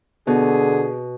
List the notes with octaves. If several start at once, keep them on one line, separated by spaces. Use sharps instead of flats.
B2 D3 G#4